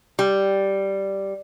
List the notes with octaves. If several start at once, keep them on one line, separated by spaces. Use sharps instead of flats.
G3